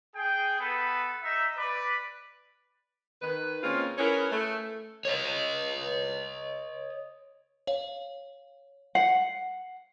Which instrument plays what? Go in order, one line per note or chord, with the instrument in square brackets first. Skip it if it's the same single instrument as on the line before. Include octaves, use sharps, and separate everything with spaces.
[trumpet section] G#4 G5
B3 A4 B4
D#4 E5
B4 D5
[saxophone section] D#3 B4
G#3 A#3 C4 C#4 F4
C#4 E4 G#4 A#4 B4 C#5
A3
[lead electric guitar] C#5 D#5
[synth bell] C#5 F5
[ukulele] F#5 [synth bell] C7